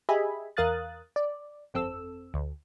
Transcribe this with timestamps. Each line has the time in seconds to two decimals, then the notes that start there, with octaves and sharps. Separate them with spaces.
0.09 G4 G#4 D#5 E5 G#5 B5
0.57 E2 A#4 F5 D#6 F#6 A6
1.16 D5
1.74 G1 F2 C4 A4 E6
2.34 D2